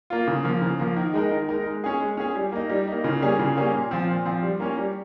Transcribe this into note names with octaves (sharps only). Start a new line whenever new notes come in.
A#3 F4
C#3
F3 A#3
C#3
F3 A#3
D#3
G#3 D#4 A#4
D#3
G#3 D#4 A#4
G#3
C#4 G#4
G#3
C#4 G#4
G3
A#3 D#4
G3
A#3 D#4
C#3
G3 A#3 C#4 G#4
C#3
G3 A#3 C#4 G#4
A#2
F3 C4
A#2
F3 C4
G3
A#3 C#4
G3